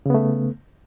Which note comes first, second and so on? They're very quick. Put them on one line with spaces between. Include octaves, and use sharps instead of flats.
C#3 B3 A3